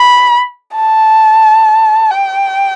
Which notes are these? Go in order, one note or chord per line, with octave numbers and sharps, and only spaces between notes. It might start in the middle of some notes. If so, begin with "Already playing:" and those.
Already playing: B5
A5
G5